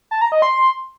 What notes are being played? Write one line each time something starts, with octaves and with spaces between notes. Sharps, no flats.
A5
A#5
D#5
C6